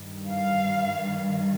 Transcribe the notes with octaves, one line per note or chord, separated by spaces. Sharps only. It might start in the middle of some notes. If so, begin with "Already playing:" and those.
Already playing: G2 D#3 G3
F5